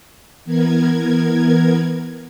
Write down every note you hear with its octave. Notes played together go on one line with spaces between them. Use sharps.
E3 B3 A#4 G#6